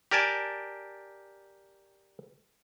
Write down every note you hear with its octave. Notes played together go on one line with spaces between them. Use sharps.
G4 A#4 D5 G#5 A5